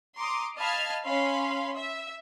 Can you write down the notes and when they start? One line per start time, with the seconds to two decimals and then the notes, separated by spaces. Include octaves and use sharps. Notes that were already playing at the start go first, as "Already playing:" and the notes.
0.17 A#5 C6 D6 D#6
0.59 D#5 F5 A5 B5 F6 G#6
1.05 C#4 F5 B5 C6
1.75 E5